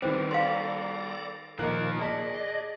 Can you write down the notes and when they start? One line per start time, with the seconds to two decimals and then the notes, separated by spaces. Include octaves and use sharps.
0.02 D#3 G3 C4 F#4 B4 C5 G5
0.31 A4 D5 F5 A#5 C6
1.59 A#2 D#3 F3 A#3 A#4 D#5 F#6
2.01 G#4 D5 D#5 A5 B6